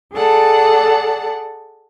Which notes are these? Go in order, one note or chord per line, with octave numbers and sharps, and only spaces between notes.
G#4 A4 D5 F#5 A5